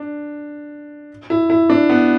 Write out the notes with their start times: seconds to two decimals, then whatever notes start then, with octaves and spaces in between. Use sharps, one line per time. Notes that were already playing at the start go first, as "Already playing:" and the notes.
Already playing: D4
1.30 E4
1.50 E4
1.70 D4
1.90 B3